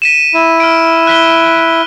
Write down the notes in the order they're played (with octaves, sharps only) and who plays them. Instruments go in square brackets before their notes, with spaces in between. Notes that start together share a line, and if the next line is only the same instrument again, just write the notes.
[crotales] B6 D#7 E7
[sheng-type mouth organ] E4
[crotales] F6 D7
F#6 B6 G7